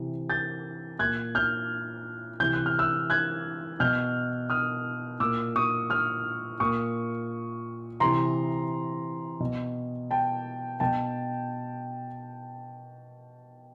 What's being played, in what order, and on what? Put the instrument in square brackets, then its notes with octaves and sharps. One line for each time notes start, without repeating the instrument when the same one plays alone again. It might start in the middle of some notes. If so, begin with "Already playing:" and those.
Already playing: [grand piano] C3 E3
G6 A6
A#2 F#6 G#6
F6 G6
C3 E3 G6
F#6
F6
E6 F#6
F#6 G#6
B2 F6 G6
D#6 F6
A#2 D6 E6
C#6 D#6
D#6 F6
A#2 C#6 D#6
C3 E3 A#5 C6
B2
G5 A5
B2 G5 A5